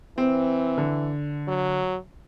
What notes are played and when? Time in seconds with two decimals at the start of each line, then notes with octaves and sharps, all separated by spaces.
0.18 E3 C4
0.78 D3
1.48 F#3